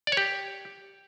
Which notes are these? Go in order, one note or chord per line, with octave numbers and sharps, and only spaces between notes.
D5
C#5
G4